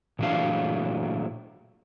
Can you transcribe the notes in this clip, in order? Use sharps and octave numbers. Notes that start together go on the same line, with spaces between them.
A#2 E3 F#3 A3 D4 F5